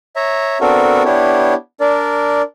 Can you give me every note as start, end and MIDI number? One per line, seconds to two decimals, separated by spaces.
0.16 0.58 73
0.16 0.58 76
0.16 0.58 82
0.61 1.03 59
0.61 1.03 60
0.61 1.03 62
0.61 1.03 66
0.61 1.03 69
0.61 1.03 70
1.05 1.54 59
1.05 1.54 62
1.05 1.54 64
1.05 1.54 67
1.05 1.54 73
1.80 2.42 62
1.80 2.42 70
1.80 2.42 74